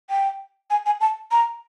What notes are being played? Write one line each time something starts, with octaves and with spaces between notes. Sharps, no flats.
G5
G#5
G#5
A5
A#5